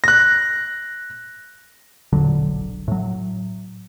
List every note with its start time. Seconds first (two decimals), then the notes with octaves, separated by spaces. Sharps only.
0.04 F#6 A#6
2.13 E1 A#1 D3 F#3
2.88 A2 F#3